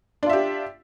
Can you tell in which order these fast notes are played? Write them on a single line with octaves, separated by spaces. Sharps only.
D4 F4 E5 G4